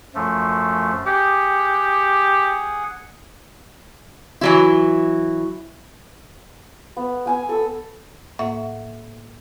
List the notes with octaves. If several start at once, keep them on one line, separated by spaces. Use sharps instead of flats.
F#2 F3 A3
G4 G#4 F#5
E3 F#3 E4
B3
B3 G#5 E6
A4 E6
A2 A#3 E5 F#5